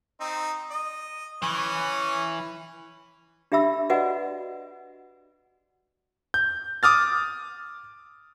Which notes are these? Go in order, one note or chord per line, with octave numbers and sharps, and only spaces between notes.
C4 D#4
D#5
E3 C#4 C#5
D4 G4 E5 B5 E6
F#4 B4 D5 D#5 F#5 G#5
G6
D6 D#6 F6 A6